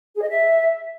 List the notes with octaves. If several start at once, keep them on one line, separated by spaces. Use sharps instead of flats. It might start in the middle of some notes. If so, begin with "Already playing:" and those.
G#4
D#5
E5